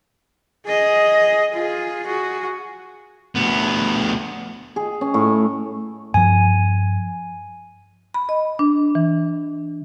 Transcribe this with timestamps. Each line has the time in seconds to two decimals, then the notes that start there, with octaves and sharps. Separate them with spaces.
0.66 G#4 D#5
1.53 F4 G#4
2.06 F#4 G#4
3.36 D2 B3
4.76 G#4
5.01 C#4
5.14 A2
6.14 G2 F3 G#5
8.14 B5
8.29 D#5
8.59 D4
8.95 E3